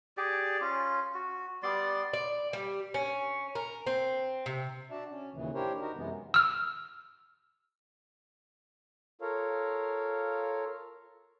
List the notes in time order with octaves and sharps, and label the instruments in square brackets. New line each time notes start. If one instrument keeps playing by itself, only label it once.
[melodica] G4 G#4 D5
C#4 F4
F#4
G3 B3 D5 C6
[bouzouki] D5
G3
C#4
A#4
C4
C3
[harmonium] D4 F#4 D5 E5 A5
C#4
D#2 A#2 C#3 E3
D4 E4 G4 A#4 C5 C#5
D#4 F#4 A#4
F#2 C3 E3 G#3 B3
[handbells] E6 F6
[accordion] F4 A4 A#4 C#5 F5